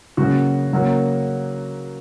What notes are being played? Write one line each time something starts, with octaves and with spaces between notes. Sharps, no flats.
C#3 F#3 A#3 F#4
C#3 F#3 A#3